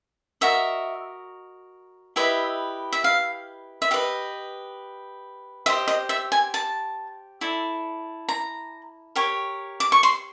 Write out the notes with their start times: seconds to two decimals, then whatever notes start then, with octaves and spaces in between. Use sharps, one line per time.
0.41 F#4 A#4 D#5 E5
2.16 E4 G4 B4 D#5 E5
2.93 E5
3.04 F5
3.82 E5
3.91 G4 B4 D#5 F5
5.66 G4 C5 D#5 E5
5.88 D#5
6.09 E5
6.32 G#5
6.54 A5
7.41 E4 A4 D5
8.29 A#5
9.16 G4 A#4 C#5
9.80 D6
9.92 C#6
10.03 C6